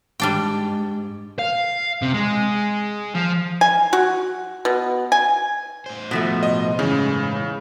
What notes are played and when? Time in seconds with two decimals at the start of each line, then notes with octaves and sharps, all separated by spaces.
0.20 G#2 G3 D4 G5
1.39 F5
2.02 C3
2.14 G#3
3.15 F3
3.61 G#5
3.93 F#4
4.65 B2
5.12 G#5
5.86 A2 C5
6.11 B2 F3 A3
6.43 D#5
6.79 A2 C#3 E3 G#3